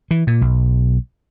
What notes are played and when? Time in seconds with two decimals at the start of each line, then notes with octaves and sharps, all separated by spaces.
0.11 E3
0.27 A#2
0.41 B1